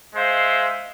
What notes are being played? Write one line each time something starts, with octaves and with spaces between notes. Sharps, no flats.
G#3 C5 E5 F5